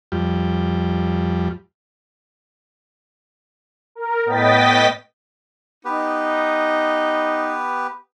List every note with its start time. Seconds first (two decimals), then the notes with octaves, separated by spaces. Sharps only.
0.12 F2 G3
3.95 A#4
4.25 A2 B3 D#5 G5 A6 B6
5.85 B3 D#4 G4 B4